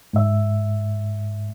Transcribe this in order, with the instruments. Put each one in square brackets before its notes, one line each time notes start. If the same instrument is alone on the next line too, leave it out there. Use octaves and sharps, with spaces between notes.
[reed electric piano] G#2 E5